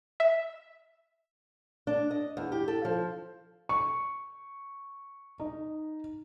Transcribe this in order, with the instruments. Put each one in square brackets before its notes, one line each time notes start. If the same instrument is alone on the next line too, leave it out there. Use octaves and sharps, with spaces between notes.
[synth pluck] E5
[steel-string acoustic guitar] D4
D#5
E2
G4
A4
F3
[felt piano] C#6
D#4